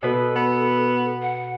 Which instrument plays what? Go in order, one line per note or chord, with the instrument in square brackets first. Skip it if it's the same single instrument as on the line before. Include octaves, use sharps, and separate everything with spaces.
[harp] B2 B4 [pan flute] A4
[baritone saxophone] B3
[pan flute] F#5